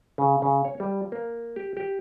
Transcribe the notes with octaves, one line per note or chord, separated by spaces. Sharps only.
C#3
C#3
C#5
G3
A#3
G4
G4